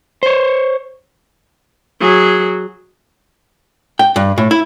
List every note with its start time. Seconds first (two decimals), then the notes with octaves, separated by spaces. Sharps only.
0.23 C5 C#5
2.00 F#3 G#4
3.99 G5
4.16 G2
4.38 A2
4.51 E4